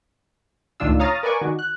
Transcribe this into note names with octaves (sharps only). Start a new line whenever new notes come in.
C#2 A2 D#3 D4 F4 E6
C#5 F5 A#5 D#6 F6 A6
A#4 B4 D5 G#5 C#6 D6
D#3 F#4
F#6